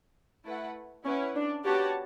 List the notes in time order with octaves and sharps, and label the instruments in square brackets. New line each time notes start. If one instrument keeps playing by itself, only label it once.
[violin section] A3 E4 B4 F#5
[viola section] C#4 [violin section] E4 B4 F#5
[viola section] D4
[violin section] B3 F#4 C#5 F#5 A5 [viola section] G4